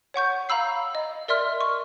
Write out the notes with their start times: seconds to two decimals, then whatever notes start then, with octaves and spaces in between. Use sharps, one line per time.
0.14 C#5 F#5 C#6 G6
0.49 F5 A#5 B5 E6 C7
0.95 D#5
1.28 A#4 D5 E5 C6 F6
1.61 C#6